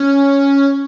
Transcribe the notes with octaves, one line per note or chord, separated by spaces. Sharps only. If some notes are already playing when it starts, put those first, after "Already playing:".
Already playing: C#4